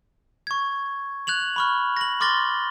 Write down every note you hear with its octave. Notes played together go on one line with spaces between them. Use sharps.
C#6 G#6
F#6 G#6 F7 F#7
B5 C#6 F6
A#6 F#7
C6 D6 F6 A6 A#6 G7